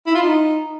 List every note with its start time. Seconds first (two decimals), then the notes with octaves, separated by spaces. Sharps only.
0.06 E4
0.14 F4
0.22 D#4